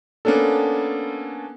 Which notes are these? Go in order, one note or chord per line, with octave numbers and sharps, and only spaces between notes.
A#3 B3 C#4 D4 A4